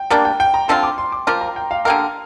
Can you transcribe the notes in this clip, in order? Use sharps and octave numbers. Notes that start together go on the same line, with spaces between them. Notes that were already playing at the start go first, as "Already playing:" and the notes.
Already playing: G5
G3 A#3 D4 G5
G5
G5
A#5
D3 F3 C4 F4 C6
D6
C6
D6
F3 A#3 F4 A#4 D6
A#5
G5
F5
D3 A#3 G4 A#4 F5